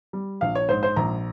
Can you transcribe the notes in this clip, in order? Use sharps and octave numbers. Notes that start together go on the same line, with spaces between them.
G3
A#1 F5
C#5
G#2 C5
C5
A#1 A#5